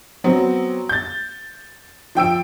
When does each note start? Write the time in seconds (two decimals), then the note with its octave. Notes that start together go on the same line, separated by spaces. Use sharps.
0.24 F#3 B3 C4
0.89 G6 A6
2.15 F3 G5 E6 D7